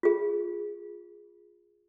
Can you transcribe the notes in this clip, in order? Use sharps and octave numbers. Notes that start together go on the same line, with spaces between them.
F4 G#4